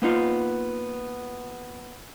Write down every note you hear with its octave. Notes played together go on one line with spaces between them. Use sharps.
A#3 B3 D#4 F4